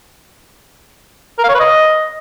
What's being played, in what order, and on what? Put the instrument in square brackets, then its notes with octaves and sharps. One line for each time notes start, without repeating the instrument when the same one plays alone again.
[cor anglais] A#4
F5
C#5
B4
D#5